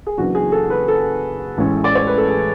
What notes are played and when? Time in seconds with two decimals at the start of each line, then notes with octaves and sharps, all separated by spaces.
0.07 G#4
0.17 F#1 F#2 E3 B3 D4 F#4
0.35 G#4
0.52 A4
0.70 B4
0.88 A4
1.58 A1 A2 G#3 C#4
1.84 D5
1.95 C#5
2.07 B4
2.18 A4
2.28 G#4